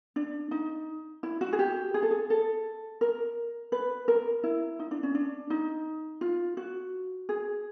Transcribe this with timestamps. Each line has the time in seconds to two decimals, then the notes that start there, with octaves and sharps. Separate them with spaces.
0.16 D4
0.51 D#4
1.23 E4
1.41 F#4
1.53 G#4
1.59 G4
1.94 G#4
2.03 A4
2.11 G#4
2.30 A4
3.01 A#4
3.72 B4
4.08 A#4
4.44 E4
4.79 D#4
4.91 D4
5.03 C#4
5.15 D4
5.50 D#4
6.21 F4
6.57 F#4
7.29 G#4